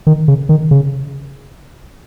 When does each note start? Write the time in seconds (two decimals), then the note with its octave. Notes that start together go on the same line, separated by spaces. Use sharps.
0.07 D#3
0.28 C#3
0.49 D#3
0.71 C#3